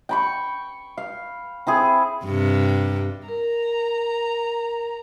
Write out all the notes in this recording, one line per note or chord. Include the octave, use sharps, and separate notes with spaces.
G5 B5 C#6
F5
C4 E4 G#4
G2 C3
A#4 A#5